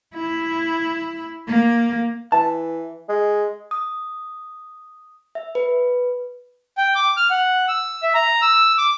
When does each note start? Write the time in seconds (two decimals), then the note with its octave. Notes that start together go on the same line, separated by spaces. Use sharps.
0.14 E4
1.47 A#3
2.32 E3 A5
3.09 G#3
3.71 D#6
5.35 E5
5.55 B4
6.78 G5
6.95 D6
7.17 F6
7.30 F#5
7.68 E6
8.03 E5
8.14 A#5
8.42 E6
8.78 D6